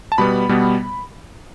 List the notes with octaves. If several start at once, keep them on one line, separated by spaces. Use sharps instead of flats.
A5
B2 G3 B3 B5
B2 G3 B3